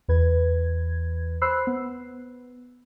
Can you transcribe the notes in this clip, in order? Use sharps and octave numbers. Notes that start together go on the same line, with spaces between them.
E2 B4 G#6
C5 B5 E6 F#6 C7
B3